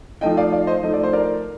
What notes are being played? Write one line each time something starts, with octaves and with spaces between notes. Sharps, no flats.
F3 A3 D#4 D#5 G5
D5 F5
D5 F5
C5 D#5
F3 A3 D#4 D#5
D5
C5
A#4 D5